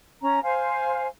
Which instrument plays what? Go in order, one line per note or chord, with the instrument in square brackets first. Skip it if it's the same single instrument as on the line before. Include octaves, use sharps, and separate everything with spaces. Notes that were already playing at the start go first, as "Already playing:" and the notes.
[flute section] C#4 A#5
[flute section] C5 F5 [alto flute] G#5